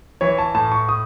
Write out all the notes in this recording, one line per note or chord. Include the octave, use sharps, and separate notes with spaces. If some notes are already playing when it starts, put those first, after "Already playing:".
E3 C#5
A5
A2 A5
C#6
D#6